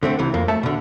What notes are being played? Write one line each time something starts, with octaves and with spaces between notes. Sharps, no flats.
D3 A3 C4
C#2 C3 E3
F2 A#3
A3 E5 A5
B2 D3